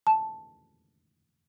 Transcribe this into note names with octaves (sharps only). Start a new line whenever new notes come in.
A5